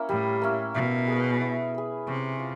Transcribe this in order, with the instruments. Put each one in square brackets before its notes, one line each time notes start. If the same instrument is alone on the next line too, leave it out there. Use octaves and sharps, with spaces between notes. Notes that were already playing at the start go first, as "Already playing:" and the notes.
Already playing: [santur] A#3 C#4 E4
[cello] A2 [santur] G3
[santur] A#3 C#4 E4
[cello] B2 [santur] E4
[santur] G#4 B4
E4
G#4 B4
[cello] C3 [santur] C#4
[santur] F4